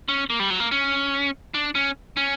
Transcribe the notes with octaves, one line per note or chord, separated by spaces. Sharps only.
C#4
A#3
G3
F#3
A#3
C#4
D4
C#4
C#4